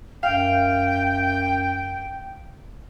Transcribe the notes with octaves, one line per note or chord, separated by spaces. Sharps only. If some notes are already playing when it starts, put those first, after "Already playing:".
F#2 F5 G5